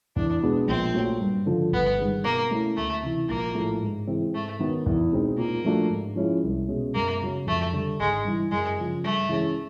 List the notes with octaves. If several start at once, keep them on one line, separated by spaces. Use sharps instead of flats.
E2 D4
B2 G#3 B3 D4
A#1 C4
A#2 F#3 A3
G2
D3 F3
G1 B3
G2 D#3 G#3
B2 A#3
F#3 A3 C#4 E4
D2 A3
C3 E3
A#1 A#3
A2 F3 A3
G#2
E3 G#3 C4
G#2 A3
D#3 F#3 B3
E2
B2 G#3 C4 D#4
A#2 A#3
F3 A3 D4 F#4
G#2
F3 G#3 C#4 E4
C2
B2 G#3 C#4
F#2 A#3
C#3 F#3
F2 A3
D3 G3
G#1 G#3
G2 E3
F#2 G#3
C#3 F3
G2 A3
E3 G#3 C#4